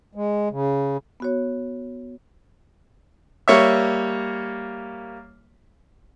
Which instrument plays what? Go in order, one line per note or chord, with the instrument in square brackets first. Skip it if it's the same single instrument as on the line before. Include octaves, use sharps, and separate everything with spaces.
[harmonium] G#3
C#3
[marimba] B3 F#4 C#5
[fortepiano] G3 A#3 C#5 E5